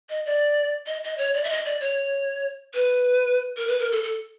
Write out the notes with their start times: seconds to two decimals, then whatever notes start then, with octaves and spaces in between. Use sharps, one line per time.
0.10 D#5
0.26 D5
0.87 D#5
1.04 D#5
1.18 C#5
1.34 D5
1.44 E5
1.50 D#5
1.65 D5
1.80 C#5
2.74 B4
3.57 A#4
3.68 B4
3.79 A#4
3.92 A4
4.03 A4